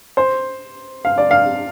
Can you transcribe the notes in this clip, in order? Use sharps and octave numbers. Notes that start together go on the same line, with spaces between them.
C5
F5
D5
F5